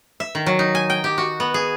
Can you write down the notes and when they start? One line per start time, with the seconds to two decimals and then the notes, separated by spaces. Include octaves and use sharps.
0.20 E5
0.35 D#3
0.46 F#3
0.59 D#4
0.75 G#5
0.90 G5
1.04 G4
1.18 F#4
1.40 B3
1.54 G#4